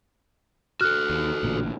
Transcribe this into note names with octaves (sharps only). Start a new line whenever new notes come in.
F#4 A4 F6 F#6
D#2
A1 A#2 D3